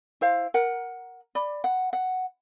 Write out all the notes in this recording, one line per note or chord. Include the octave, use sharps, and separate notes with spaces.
E4 C5 F5
A#4 F#5
D5 B5
F#5
F#5